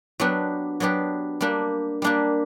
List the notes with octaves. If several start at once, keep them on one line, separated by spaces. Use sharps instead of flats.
F#3 B3 D4 G4
F#3 B3 D4 G4
G3 A#3 D4 G4
G3 A#3 D4 G4